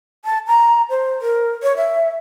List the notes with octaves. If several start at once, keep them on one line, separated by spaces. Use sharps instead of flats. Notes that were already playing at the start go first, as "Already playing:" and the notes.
A5
A#5
C5
A#4
C#5
E5